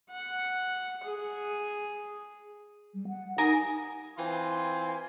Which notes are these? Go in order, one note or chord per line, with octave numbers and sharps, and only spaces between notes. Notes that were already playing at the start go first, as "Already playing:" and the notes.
F#5
G#4
G3
F#5
D#4 A#4 G#5 D#6
E3 C4 F4 G#5 C6